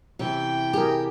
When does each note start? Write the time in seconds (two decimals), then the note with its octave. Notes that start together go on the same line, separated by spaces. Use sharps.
0.19 C3 E3 C#4 G4 G5
0.73 G4 G#4 A#4